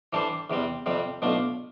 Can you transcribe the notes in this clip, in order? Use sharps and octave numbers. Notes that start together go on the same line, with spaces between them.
E3 G3 D4 A4 C5
E2 C3 G3 C4
F2 C3 G3 C4
B1 B2 A3 D4 F4